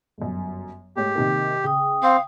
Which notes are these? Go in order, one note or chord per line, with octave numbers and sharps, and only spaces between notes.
G1 F#2
G#2 A3 G4 C#5
C3 D#3 A#3
C#3 G5 D#6
C4 F5